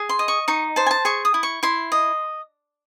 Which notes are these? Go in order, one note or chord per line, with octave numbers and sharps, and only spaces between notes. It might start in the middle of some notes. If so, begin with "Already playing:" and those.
Already playing: G#4
C6
D#5
C#6
D#4 C#6
C5 A5
G#5
A5
G#4 C#6
D#6
E4
C#6
E4 C6
D#5